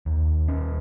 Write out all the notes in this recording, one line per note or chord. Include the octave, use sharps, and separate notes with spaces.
D#2
C#4